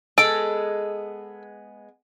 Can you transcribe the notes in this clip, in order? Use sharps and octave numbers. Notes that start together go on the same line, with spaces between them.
G#3 B3 A4 D7